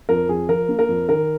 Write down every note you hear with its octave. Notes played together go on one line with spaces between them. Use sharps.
F2 A#4
F2 G#4
F3 A#4
A#3
A#4
F2
D#3 A#4